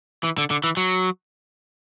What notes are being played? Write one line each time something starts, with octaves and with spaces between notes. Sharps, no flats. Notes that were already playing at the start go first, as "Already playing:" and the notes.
E3
D3
D3
E3
F#3